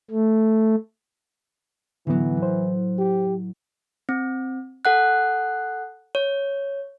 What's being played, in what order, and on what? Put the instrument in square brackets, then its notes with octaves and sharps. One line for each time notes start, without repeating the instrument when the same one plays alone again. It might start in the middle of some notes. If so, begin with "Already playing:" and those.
[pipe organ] A3
[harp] A2 F#3 [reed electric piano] D3 B3 [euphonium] E3
[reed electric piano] C5
[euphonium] G4
[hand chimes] C4
A4 F#5 F#6
C#5